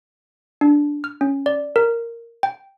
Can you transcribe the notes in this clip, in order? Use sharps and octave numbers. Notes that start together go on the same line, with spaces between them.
D4
F6
C#4
D5
A#4
G5